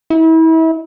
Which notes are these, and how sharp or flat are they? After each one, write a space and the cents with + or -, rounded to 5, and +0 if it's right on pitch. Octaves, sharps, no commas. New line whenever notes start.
E4 -35